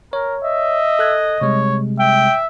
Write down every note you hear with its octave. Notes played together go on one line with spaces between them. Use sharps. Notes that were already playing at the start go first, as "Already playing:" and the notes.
A#4 C#5
D#5 E5
A4 F#6 G#6
C3 G3 G#3 C#5
E5 G5